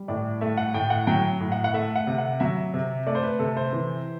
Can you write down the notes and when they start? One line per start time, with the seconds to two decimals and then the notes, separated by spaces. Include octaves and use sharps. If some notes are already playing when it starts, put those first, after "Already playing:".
Already playing: G3
0.08 A2 D5
0.41 A3 E5
0.57 F#5
0.74 A2 G5
0.90 F#5
1.07 F#3 G5
1.40 A2
1.52 F#5
1.64 F#5
1.74 A3 E5
1.96 F#5
2.07 C3
2.18 F#5
2.40 F#3 E5
2.74 C3
3.06 A3 D5
3.15 C5
3.23 B4
3.39 C3 A4
3.57 C5
3.73 E3